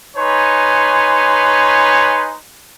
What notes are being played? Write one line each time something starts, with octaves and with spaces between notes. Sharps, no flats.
D#4 B4 C#5 G#5 C6